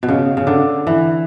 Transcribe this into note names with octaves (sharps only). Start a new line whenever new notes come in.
B2
C#3
C#3
D3
E3